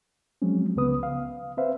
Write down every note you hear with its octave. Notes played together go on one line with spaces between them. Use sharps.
F3 F#3 G#3 C4 C#4
C#2 C#3 B3 B4 D#6
F5
C4 B4 C5 E5 F5